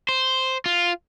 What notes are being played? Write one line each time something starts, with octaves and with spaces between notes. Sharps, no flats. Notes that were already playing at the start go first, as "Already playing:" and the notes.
C5
F4